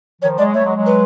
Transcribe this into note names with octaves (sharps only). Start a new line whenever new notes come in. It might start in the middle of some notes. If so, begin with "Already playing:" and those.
D#3 F3 C#5
F#3 G#3 D5
G3 A3 C#5
F#3 G#3
F#3 G#3
B4